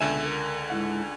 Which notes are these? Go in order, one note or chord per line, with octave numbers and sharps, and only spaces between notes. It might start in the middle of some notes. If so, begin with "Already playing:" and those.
C#2 B2 D3 A4 E5 G#5
A#4
G#2 E4 F#5